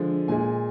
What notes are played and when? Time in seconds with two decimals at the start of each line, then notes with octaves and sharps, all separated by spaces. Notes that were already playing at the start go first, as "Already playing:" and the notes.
Already playing: D3 F3 G#3
0.28 A#2 G#3 G#5